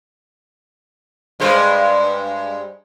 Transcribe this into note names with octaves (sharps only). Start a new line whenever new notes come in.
G2 G#3 C5